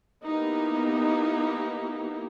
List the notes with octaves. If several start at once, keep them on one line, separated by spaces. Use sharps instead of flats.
A#3 B3 D#4 E4 G4